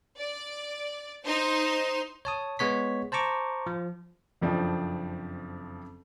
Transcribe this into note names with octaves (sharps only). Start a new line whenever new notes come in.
D5
D#4 C5 C6
C#5 A5 D#6
G#3 B3 C#5 B6
C5 A5 A#5 C#6 D6
F3
F#1 F2 F3 C4 D4